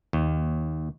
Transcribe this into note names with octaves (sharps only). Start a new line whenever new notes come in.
D#2